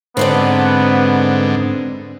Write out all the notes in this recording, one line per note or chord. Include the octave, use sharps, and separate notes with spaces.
G#2 D3 B3 C4 A4 D5